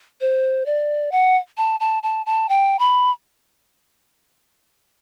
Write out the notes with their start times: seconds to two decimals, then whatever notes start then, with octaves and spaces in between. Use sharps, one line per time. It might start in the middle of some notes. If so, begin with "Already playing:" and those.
0.21 C5
0.66 D5
1.12 F#5
1.58 A5
1.80 A5
2.03 A5
2.26 A5
2.49 G5
2.79 B5